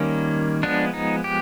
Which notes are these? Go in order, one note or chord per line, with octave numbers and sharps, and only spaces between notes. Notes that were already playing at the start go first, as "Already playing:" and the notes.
Already playing: D#3 G3 A#3 C#4
F3 G#3 B3 D4
D#4
G4